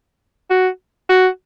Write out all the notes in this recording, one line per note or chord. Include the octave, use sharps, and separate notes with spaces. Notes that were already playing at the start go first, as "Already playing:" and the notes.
F#4
F#4